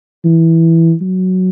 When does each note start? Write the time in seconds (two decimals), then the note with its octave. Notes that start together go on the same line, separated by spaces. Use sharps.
0.25 E3
1.02 F#3